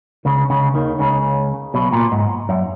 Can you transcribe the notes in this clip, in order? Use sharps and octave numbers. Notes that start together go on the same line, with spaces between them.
C#2 C#3
C#2 C#3
D#2 D#3
C#2 C#3
B1 B2
A#2
G#2
F#2